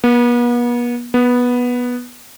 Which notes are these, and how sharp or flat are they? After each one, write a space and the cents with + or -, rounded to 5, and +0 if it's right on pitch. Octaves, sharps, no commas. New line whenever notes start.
B3 -40
B3 -10